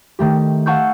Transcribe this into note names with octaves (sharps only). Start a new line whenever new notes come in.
D#3 A3 G4
F5 F#5 A5 C#6 E6 G6